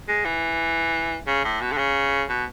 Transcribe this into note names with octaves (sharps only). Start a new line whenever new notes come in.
G#3
E3
C#3
A2
B2
D3
C#3
B2